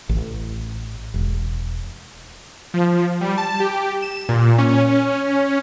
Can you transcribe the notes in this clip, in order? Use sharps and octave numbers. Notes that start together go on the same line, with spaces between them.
A1
E1
F3
G3
A5
G4
E7
A#2
C#4